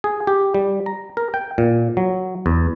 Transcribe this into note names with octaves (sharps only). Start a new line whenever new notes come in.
G#4
G4
G3
A#5
A#4
G5
A#2
F#3
E2